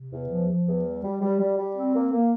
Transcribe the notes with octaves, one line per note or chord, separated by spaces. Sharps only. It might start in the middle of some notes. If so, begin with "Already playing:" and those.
Already playing: C3
E2
F3
F3
E2
G3
G3
G3
G3
G3
C4
A#3
A#3